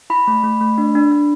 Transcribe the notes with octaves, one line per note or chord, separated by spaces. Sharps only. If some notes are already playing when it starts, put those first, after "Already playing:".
E4 B5
A3
A3
A3
D4
D4
D4